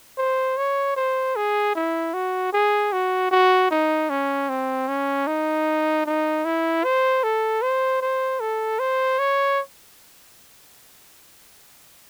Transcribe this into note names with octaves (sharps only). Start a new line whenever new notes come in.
C5
C#5
C5
G#4
E4
F#4
G#4
F#4
F#4
D#4
C#4
C4
C#4
D#4
D#4
E4
C5
A4
C5
C5
A4
C5
C#5